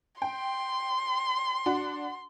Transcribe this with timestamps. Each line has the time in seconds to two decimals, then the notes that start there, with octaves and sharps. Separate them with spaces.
0.22 G5 C6
1.66 D4 F#4 F#5